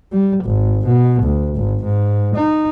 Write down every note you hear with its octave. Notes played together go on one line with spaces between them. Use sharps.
G3
G#1
B2
D2
G#1
G#2
D#4